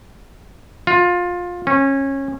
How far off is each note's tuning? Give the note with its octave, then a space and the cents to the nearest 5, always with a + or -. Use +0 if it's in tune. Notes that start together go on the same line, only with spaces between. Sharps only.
F4 +20
C#4 -20